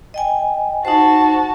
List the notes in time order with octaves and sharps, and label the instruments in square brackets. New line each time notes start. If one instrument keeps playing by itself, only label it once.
[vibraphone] D#5 G5 G#5
[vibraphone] D#4 C5 [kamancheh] F#4 A5